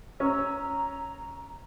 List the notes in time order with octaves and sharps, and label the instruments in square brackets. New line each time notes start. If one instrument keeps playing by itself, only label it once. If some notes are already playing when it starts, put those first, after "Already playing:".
[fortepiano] C#4 [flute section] A#5 E6
[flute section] A#5